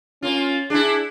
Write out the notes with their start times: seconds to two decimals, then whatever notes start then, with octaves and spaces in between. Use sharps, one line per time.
0.23 A#3 C#4 F4
0.70 D4 E4 G#4